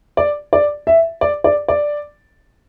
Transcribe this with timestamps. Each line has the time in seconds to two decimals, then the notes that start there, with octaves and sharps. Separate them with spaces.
0.17 D5
0.53 D5
0.87 E5
1.21 D5
1.44 D5
1.68 D5